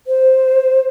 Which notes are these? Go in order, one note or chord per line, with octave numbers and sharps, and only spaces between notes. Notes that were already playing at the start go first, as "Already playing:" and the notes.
C5